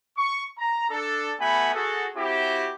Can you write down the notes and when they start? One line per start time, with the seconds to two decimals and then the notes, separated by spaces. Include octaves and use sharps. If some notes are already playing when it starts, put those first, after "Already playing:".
0.17 C#6
0.58 A#5
0.90 D4 A4
1.40 A3 B3 F#4 F#5 G#5 B5
1.74 F#4 G#4 A4
2.16 C4 E4 F#4 G4